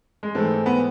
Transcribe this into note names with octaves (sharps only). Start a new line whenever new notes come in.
G#3
G#2 E3 G#3 A3 C4
B3